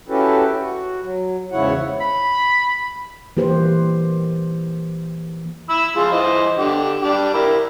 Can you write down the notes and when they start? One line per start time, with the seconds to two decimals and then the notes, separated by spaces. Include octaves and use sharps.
0.09 C#4 E4 F#4 G4 A4 B4
0.60 F#4
1.02 F#3
1.52 E2 G#2 C#3 E4 C#5 F#5
2.01 B5
3.37 E3 A#3 G4 B4 C5
5.70 E4 B5 E6
5.96 F3 G#3 F4
6.12 E3 C5 D#5
6.57 D3 G4
7.02 D4 G4 D5
7.34 E4 G4 A#4